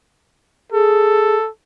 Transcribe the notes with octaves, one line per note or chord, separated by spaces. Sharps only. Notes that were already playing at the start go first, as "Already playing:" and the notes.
G#4 A4